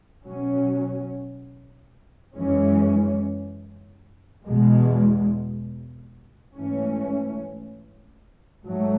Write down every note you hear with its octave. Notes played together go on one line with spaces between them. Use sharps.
B2 F#3 C#4
F#2 E3 G#3 C#4
E2 B2 G#3
G#2 E3 A3 C#4
G#2 F#3 A3